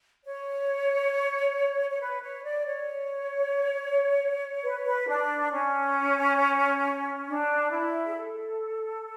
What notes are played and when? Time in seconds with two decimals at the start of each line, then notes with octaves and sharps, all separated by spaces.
0.24 C#5
1.90 C#5
2.00 B4
2.22 C#5
2.44 D5
2.66 C#5
4.63 B4
4.74 C#5
4.85 B4
5.07 D4
5.51 C#4
7.27 D4
7.70 E4
8.06 G#4
8.15 A4